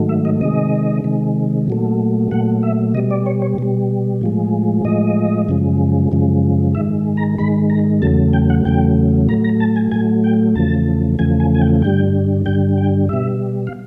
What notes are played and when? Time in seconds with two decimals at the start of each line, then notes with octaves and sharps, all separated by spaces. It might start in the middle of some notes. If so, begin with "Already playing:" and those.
Already playing: G#2 D#3 F#3 A3
0.09 E5
0.25 D#5
0.41 C3 D#3 G#3 D#5
1.04 C3 D#3 G#3
1.68 A#2 F#3 A3
2.31 A#2 F#3 A3 F#5
2.63 E5
2.94 B2 G3 D#5
3.11 D5
3.26 C#5
3.42 C#5
3.58 B2 G3
4.21 A2 F3 G#3
4.85 A2 F3 G#3 D#5
5.49 F#2 C#3 F3 G#3
6.12 F#2 C#3 F3 G#3
6.75 G#2 D#3 G#3 E5
7.17 A#5
7.38 G#2 D#3 G#3 B5
7.70 A#5
8.02 E2 C#3 F#3 A3 A5
8.33 G5
8.50 F#5
8.65 E2 C#3 F#3 A3 G5
9.28 A2 F#3 A3 A#5
9.44 A#5
9.60 A5
9.76 G#5
9.92 A2 F#3 A3 G#5
10.24 G5
10.55 E2 C#3 F3 A3 A5
11.19 E2 C#3 F3 A3 G#5
11.40 G#5
11.54 G#5
11.61 G5
11.82 G2 D3 G3 G5
12.46 G2 D3 G3 G5
12.78 G5
13.09 B2 G3 E5
13.67 F5